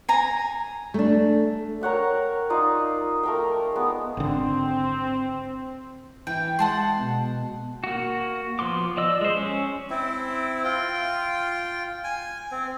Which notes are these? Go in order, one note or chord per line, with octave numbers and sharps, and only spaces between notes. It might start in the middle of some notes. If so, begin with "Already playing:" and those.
G#5 A#5
A3 D4
A#4 C#5 F#5 G5
D#4 F4 D5 D#6
A3 A#4 G5
G#3 B3
G#1 D3 C4
E3 E4 G5
G#3 F#5 A5 C6
B2
A#3 F#4
F3 B3 C6 D6
F3 D5 D#5 E6
G#3 C5
C#4
C4 E4
F4 G5
G#5
C4